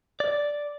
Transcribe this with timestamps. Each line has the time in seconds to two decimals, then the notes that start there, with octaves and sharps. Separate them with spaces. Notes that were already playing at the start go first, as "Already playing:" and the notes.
0.20 D5